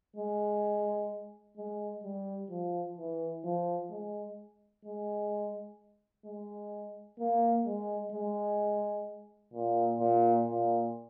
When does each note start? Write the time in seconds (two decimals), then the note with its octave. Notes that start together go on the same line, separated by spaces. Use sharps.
0.17 G#3
1.58 G#3
2.04 G3
2.50 F3
2.97 E3
3.44 F3
3.91 G#3
4.85 G#3
6.25 G#3
7.19 A#3
7.65 G#3
8.12 G#3
9.54 A#2
10.00 A#2
10.46 A#2